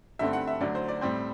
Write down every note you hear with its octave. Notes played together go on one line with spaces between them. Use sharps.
G2 D3 A3 C4 E5
F#5
E5
D2 D3 F#3 D5
C5
D5
A2 G3 C4 C5